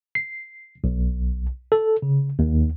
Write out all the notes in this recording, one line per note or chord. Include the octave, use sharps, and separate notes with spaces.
C7
B1
A4
C#3
D#2